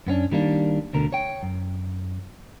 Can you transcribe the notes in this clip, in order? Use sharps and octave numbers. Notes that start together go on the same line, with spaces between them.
F#2 B3 C#4 D4
D#3 G3 A#3 D4
D2 B2 D3 A#4
C#5 G5
F#2